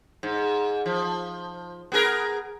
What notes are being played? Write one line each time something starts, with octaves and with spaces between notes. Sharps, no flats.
G#2
F3
B3 G#4 A#4